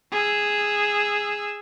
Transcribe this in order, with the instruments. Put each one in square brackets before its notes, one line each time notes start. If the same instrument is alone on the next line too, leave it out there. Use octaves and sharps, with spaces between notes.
[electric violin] G#4 E6